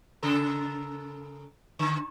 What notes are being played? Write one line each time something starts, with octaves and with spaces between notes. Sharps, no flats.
C#3 A4 A#4
D3